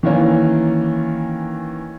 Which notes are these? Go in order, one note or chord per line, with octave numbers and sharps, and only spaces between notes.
D#3 E3 A#3 C#4